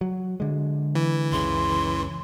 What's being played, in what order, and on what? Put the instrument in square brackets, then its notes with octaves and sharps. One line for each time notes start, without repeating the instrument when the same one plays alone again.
[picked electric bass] F#3
D3 G#3
[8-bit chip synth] E3
[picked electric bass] F#1 C#2 C#3 [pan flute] C6